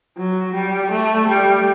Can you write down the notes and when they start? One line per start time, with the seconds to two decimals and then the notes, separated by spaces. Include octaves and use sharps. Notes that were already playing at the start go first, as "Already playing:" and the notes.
0.17 F#3
0.54 G3
0.91 A3
1.28 G3